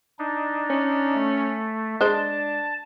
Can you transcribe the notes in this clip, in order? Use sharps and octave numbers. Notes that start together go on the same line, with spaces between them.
D4 D#4
C#4
A3
G#3 D4 C5 A5